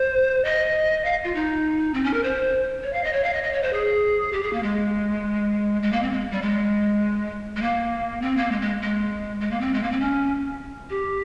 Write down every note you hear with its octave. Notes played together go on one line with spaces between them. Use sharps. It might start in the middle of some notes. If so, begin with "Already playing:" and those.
Already playing: C5
D#5
F5
F4
D#4
C4
C#4
A#4
C5
C#5
F5
D#5
C#5
F5
D#5
D#5
C#5
C5
G#4
G4
G#4
A#3
G#3
G#3
A#3
C4
G#3
G3
G#3
G#3
A#3
C4
A#3
G#3
G#3
G#3
G#3
A#3
C4
G#3
A#3
C4
C#4
G4